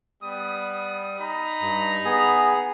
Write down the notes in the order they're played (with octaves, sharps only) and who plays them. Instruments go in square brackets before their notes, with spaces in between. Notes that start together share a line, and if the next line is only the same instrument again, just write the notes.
[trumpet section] G3 B3 D#6
D#4 A#5 B5
[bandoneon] G2
B3 G#4